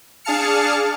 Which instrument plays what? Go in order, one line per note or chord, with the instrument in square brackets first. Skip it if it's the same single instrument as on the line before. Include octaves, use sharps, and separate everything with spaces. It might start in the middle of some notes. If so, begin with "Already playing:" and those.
[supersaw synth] D4 G#4 F5 A5 F6 C#7